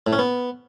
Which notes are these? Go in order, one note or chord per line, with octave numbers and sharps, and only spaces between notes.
A2
C#4
B3